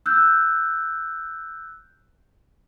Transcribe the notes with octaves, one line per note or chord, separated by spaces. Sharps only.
E6 F#6 G6